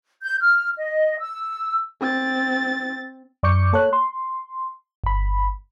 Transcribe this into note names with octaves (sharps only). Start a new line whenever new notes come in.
G6
F6
D#5
E6
C4 A6
F#2 D5 C#6 D6 G6 C#7
A#3 A4 C#5 F#6
C6
G1 B5